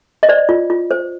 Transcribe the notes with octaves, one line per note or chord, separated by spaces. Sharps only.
D#5
C5 D5
F4
F4
C5